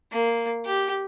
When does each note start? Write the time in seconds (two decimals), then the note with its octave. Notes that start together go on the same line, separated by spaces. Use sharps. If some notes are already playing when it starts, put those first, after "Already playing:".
0.12 A#3
0.65 G4